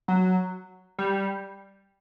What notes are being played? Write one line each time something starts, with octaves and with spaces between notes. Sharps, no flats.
F#3
G3